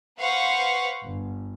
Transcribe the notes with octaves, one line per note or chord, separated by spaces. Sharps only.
B4 C5 F5 F#5 C#6
G1